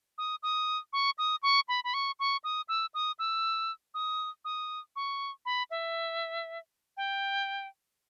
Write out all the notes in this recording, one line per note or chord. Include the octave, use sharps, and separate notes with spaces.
D#6
D#6
C#6
D#6
C#6
B5
B5
C#6
C#6
D#6
E6
D#6
E6
D#6
D#6
C#6
B5
E5
G5